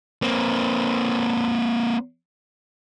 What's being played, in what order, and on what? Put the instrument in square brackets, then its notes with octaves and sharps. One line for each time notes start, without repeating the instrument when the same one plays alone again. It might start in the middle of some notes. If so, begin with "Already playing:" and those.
[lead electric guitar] A#3 C4